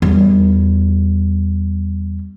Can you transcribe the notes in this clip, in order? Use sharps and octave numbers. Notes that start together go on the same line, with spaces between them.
E2 G3